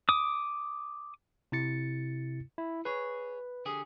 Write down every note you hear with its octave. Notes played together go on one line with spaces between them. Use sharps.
D6 D#6
C3 E4 A6 C#7
E4
G#4 B4 C#5
D3 G4 G#4